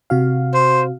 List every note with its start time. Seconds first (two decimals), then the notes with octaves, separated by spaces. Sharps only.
0.10 C3 F#4 F5
0.54 C5